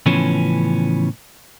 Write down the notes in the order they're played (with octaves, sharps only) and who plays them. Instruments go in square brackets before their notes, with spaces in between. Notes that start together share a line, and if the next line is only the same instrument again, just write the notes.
[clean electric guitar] A2 C#3 E3 F3 B3 C#4